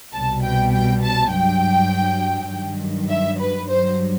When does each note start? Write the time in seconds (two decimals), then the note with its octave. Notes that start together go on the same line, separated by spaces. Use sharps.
0.13 C2 B2 G3 A5
0.43 G5
0.72 G5
1.03 A5
1.31 G2 F#3 G5
2.50 G2 D#3 F#3
3.10 E5
3.40 B4
3.69 G2 F#3 C5